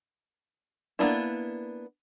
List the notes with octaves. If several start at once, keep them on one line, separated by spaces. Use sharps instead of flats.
A#3 B3 D4 E4